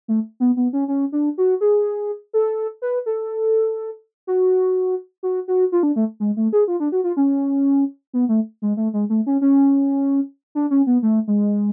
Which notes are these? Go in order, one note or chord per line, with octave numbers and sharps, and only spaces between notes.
A3
B3
B3
C#4
C#4
D4
F#4
G#4
A4
B4
A4
F#4
F#4
F#4
F4
D4
A3
G#3
A3
G#4
F4
D4
F#4
F4
C#4
B3
A3
G#3
A3
G#3
A3
C#4
C#4
D4
C#4
B3
A3
G#3